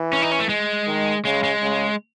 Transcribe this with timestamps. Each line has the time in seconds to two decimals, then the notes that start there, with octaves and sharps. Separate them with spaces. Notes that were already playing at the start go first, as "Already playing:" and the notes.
Already playing: E3
0.13 C#4
0.22 D#4
0.32 C#4
0.40 A3
0.49 G#3
0.87 D#3
1.25 C#3 G#3
1.44 G#3
1.62 C#3